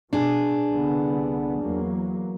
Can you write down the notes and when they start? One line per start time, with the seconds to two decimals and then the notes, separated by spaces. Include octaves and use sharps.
0.13 B2 D4 G#4
0.68 C2 D3 B3
1.59 E2 F#3 A#3